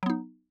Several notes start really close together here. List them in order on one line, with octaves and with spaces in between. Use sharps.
F#3 B3 D#4